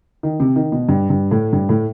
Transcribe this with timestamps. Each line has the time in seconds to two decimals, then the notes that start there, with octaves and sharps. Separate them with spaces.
0.23 D#3
0.40 C3
0.56 D#3
0.72 B2
0.89 G2
1.10 G2
1.31 A2
1.53 G2
1.69 A2